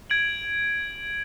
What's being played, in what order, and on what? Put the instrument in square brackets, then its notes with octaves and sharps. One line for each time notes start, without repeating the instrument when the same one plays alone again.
[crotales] G#6 D7 F#7